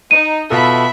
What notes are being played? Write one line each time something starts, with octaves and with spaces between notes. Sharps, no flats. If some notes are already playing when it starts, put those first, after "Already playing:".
D#4 D#7
B2 F4 A4 E5 B5